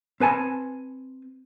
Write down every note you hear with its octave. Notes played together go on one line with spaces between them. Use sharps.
C4 B4 G#5 A5